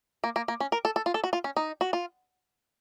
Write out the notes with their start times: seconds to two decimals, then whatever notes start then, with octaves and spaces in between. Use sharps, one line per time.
0.24 A#3
0.36 A#3
0.48 A#3
0.60 C#4
0.72 A#4
0.85 A4
0.96 A4
1.06 F4
1.14 A4
1.24 F#4
1.33 F4
1.44 C#4
1.57 D#4
1.81 F#4
1.93 F4